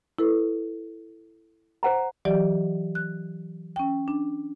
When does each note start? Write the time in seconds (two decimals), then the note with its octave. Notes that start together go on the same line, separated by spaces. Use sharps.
0.19 E4 A4 B4
1.83 C5 F#5 A#5
2.25 E3 F#3 G4 D5 D#5
2.95 F#6
3.76 C#4 G5
4.08 D4